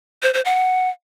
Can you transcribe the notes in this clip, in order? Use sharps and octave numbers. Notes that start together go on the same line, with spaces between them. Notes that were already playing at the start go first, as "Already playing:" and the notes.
C5
C5
F#5